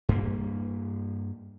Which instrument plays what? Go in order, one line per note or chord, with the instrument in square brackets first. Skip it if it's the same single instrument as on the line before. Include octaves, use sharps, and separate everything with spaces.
[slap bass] G2 A#3